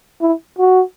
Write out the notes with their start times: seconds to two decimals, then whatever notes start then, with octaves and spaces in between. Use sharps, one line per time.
0.21 E4
0.59 F#4